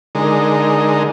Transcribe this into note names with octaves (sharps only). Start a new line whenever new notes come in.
D3 G#3 D#4 A#4